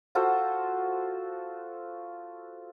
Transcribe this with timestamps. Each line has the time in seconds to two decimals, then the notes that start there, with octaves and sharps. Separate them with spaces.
0.15 F4 F#4 A4 C5